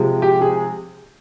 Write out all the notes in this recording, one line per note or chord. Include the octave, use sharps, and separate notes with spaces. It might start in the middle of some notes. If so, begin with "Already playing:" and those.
Already playing: C3 F3 G#3
G4
G#4